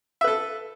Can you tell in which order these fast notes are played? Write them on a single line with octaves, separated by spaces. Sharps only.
E5 B4 A4